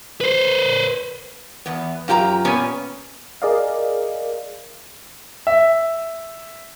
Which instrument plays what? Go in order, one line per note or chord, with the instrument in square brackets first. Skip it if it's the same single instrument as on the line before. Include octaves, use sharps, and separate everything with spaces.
[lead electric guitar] B4 C5
[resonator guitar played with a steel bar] E2 B3
F#2 F4 G4 A5 A#5
A#2 B3 C#4 G#5
[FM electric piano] G#4 A#4 D5 D#5 F5
[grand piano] E5